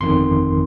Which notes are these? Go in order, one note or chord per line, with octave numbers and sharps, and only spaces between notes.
G1 F2 D#3 C6